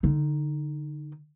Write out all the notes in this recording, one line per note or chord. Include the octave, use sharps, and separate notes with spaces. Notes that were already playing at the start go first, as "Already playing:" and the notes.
D3 D#4